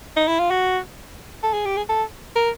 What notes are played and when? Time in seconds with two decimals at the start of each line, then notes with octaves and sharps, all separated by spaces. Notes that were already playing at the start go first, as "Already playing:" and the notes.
0.17 D#4
0.28 E4
0.39 F4
0.51 F#4
1.43 A4
1.54 G#4
1.65 G4
1.77 G#4
1.89 A4
2.36 A#4